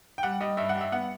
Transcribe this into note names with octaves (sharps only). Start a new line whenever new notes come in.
G5
G3 F#5
G3 D#5
G2 E5
F#5
G3
E5
B3 F#5